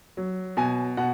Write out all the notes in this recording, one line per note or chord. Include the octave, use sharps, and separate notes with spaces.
F#3
B2 G#5
B2 F#5